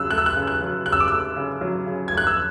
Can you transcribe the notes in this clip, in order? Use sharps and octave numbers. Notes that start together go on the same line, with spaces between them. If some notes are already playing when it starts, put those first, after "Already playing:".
Already playing: C#3 F#3 E6 F#6
A3 F#6
E6
F#6
C#3
F#6
F#3
C#3 F#6
E6
D6
A3 E6
C#3
F#3
C#3
A3 G#6
F#6
E6